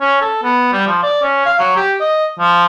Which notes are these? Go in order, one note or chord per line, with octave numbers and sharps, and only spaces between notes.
C#4
A4
B3
G3
F3
D5
C#4
F5
F#3
G4
D#5
F3